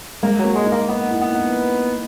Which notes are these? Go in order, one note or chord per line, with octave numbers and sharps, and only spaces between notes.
G#3 A#3
F#3 A#3
G#3
D#4
A#3
B3 D#4
E4
B3
D#4